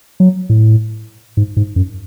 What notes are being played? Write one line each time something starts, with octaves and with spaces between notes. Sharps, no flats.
F#3
A2
G#2
G#2
F#2